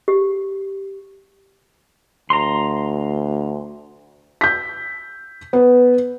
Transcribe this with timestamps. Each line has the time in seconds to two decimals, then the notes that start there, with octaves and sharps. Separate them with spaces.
0.08 G4
2.30 D2 A#5 C6
4.41 G6 B6
5.53 B3